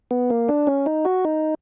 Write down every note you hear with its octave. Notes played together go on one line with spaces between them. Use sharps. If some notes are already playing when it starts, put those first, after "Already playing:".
B3
A#3
D4
C#4
D#4
F#4
D#4